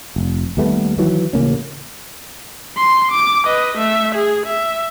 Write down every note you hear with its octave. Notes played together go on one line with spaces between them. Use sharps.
F1
D#2 G3 A3 B3
D#3 E3 F#3
A1 C#3 A#3 C#4
C6
D6
B4 D#5
A3 E5
G#4
E5